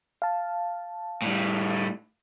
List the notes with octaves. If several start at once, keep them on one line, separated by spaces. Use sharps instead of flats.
F5 A5
A2 G3